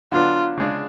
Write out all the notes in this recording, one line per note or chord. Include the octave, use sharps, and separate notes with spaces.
D3 F#3 B3 D4 F4
C#3 G#3 D4